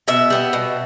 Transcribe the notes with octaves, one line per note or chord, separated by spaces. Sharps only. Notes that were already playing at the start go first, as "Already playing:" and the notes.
B2 E5
G3 B3
B2